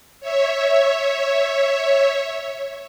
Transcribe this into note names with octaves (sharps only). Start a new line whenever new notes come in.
C#5 E5